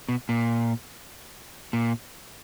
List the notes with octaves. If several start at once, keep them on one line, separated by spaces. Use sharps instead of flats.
B2
A#2
A#2